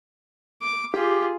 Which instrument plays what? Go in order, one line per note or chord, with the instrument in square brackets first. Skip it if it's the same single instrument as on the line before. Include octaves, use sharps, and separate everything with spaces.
[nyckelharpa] D6
[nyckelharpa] F4 G#4 [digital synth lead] G4